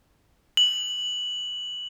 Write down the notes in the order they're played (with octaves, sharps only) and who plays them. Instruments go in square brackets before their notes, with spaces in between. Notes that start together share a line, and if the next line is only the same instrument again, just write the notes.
[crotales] F#7